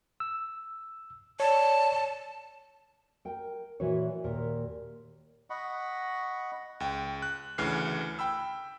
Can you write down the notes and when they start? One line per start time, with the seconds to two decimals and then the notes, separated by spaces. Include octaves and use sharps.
0.20 E6
1.40 C#5 D5 A5
3.25 A#4 G5
3.80 A#2 E3 F#4 B4 C#5
4.24 D#2 A#2 A#4
5.50 D#5 F#5 B5 C#6
6.80 C#2 G5
7.22 F#6
7.58 D2 C#3 E3 F6 C7
8.19 G5 B5 E6